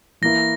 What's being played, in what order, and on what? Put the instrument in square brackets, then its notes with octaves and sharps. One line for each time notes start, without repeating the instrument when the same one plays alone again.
[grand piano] E3 A#3 E4 [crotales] A#6